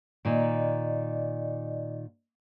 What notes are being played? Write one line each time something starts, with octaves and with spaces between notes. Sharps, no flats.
A#2 D#3 D5 D#5